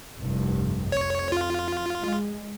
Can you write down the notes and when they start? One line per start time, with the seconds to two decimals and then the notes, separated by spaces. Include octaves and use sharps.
0.18 F1 C2 G2
0.92 F2 C#5
1.32 F4
1.99 G#3